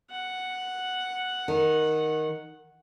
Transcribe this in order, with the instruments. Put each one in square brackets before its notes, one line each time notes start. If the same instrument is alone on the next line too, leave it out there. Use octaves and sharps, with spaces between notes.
[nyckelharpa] F#5
[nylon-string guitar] D#3